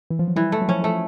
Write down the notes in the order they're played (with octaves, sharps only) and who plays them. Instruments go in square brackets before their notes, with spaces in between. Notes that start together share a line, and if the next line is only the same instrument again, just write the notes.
[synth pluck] E3
F3
F#3
[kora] E3 [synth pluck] G3
[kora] A3
[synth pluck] F#3
[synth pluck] F3 [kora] C#4
[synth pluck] F3 [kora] A3